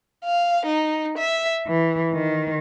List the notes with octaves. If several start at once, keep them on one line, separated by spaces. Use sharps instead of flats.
F5
D#4
E5
E3
D#3